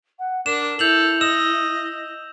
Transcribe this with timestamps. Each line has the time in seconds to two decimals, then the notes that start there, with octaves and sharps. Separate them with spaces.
0.19 F#5
0.46 D4 A#4 E7
0.79 E4 A4 G6 F7 F#7
1.21 D#5 E6 E7